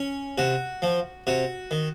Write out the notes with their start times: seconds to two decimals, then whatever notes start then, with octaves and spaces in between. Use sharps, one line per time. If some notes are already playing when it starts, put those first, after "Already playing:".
Already playing: C#4
0.38 C3 F#4
0.82 F3
1.27 C3 F#4
1.71 D#3